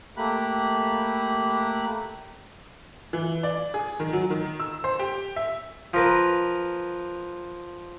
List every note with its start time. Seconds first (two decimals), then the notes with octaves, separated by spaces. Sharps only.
0.17 A3 A#3 G4 B5 F#6
3.13 E3
3.43 D5
3.74 G#4
4.00 D#3
4.13 F#3
4.30 D#3
4.60 E6
4.84 C5
4.99 G4
5.36 E5
5.94 F3 A#4 B4